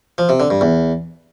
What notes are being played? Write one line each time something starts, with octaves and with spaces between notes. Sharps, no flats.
F3
C3
D3
G2
E2